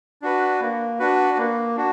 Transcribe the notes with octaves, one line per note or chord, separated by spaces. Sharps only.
D4 F#4 B4
A#3
D4 F#4 B4
A#3
D4 F#4